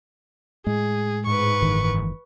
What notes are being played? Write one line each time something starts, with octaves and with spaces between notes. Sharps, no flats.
A2 G#3 G#4
G#2 B4 C#6
F#1 D#3 E3